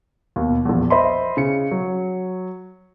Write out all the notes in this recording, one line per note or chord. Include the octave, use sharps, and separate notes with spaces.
D#2 B2
A#1 E2
C5 D#5 E5 B5 C6
C#3 C#7
F#3